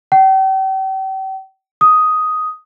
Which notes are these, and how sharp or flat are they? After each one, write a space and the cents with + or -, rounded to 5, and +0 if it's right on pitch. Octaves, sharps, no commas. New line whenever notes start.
G5 -40
D#6 +5